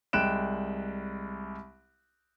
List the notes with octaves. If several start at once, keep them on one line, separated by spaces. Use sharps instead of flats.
C2 G#3 G5 F#6 D7 E7